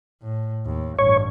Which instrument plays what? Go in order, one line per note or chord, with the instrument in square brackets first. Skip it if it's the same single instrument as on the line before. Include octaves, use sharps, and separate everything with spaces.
[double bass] A2
D#2
[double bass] A1 G2 [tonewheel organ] C#5